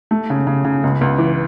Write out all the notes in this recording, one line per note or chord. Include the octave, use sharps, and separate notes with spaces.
A3
C#3
C#3
C#3
C#2
C#2
E3